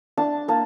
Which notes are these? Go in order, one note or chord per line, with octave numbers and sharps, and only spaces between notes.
D4 A5
A#3 A5